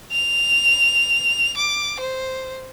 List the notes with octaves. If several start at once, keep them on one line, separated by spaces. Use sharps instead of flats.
F7
D6
C5